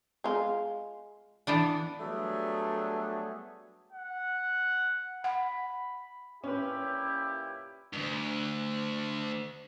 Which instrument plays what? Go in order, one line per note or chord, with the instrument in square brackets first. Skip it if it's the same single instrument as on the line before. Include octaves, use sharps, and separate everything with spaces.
[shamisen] G#3 F4
[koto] E3 B3 D4
[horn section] F#3 G3 A3 B3 D4 G#4
[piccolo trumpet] F#5
[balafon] F#5 [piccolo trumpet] B5
[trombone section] A#2 E4 G4 [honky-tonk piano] C#4 B4
[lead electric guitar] D2 G2